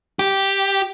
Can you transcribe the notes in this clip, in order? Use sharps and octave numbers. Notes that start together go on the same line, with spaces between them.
G4